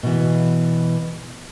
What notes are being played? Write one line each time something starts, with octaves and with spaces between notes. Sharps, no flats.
B2 E3